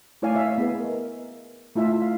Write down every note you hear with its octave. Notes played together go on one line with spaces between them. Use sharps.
A3 E4 C#5 D5 F5 G#5
C#5 E5 F5
B3 G#4 B4
A#4 D#5
A3 E4 F4 E5
F5